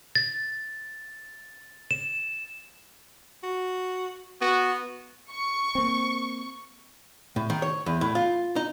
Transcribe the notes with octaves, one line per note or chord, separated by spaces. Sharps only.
A6
E7
F#4
B3 F#4
C#6
A#3 C4
A2
D#3
C#5
E2
A2
F4
D#4